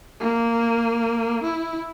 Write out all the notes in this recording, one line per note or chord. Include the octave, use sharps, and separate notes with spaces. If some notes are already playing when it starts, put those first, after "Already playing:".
A#3
E4